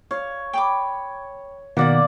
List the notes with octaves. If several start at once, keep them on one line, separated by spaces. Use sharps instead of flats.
C#5 F5
G5 B5 D6
B2 D#3 A#3 F#4 D5 F#5